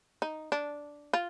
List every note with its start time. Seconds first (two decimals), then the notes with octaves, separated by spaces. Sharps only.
0.22 D#4
0.52 D4
1.13 F4